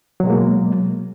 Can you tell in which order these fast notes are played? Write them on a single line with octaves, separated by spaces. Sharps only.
F#3 B2 G#3 A#3